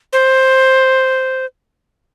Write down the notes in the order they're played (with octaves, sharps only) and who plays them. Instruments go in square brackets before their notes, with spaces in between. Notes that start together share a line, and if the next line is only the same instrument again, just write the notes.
[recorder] C5